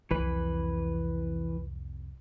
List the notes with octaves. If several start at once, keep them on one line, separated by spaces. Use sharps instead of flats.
C2 F2 E3 B4